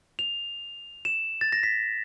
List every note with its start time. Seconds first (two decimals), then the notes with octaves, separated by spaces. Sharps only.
0.19 F7
1.05 E7
1.41 A6
1.52 A#6
1.63 B6